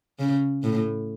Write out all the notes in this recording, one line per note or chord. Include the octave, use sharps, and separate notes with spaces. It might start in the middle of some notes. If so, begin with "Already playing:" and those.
C#3
A2